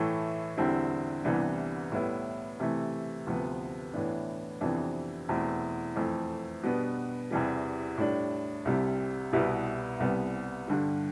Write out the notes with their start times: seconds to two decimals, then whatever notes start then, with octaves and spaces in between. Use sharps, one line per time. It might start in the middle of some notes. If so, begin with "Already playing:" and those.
Already playing: A2 E3 A3
0.57 E2 D3 G3 C4 E4
1.24 C2 C3 E3 B3 D4
1.92 A2 G3 B3 E4
2.60 C3 E3 A3
3.27 D2 C3 F3 B3
3.93 A2 E3 B3 D4
4.61 F2 C3 E3 B3 D4
5.28 E2 B2 A3 C4 E4
5.95 F2 E3 A3
6.63 B2 G3 B3 D4
7.31 E2 C3 E3 G3
7.98 A2 G3 D4
8.65 C2 C3 G3
9.33 C2 B2 G3 B3 E4
10.00 C2 C3 G3 B3
10.68 G2 D3 G3